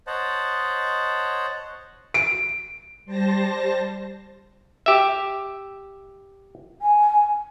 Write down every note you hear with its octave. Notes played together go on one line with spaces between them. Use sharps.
C5 C#5 D#5 F#5 A5
D7
G3 C5 A5 A#6
G4 E5
G#5